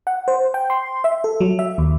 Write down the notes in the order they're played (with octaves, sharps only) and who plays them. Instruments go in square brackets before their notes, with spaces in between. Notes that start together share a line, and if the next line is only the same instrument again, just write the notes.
[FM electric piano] F#5
C5
G5
C6
E5
A4
F#3
E5
D#2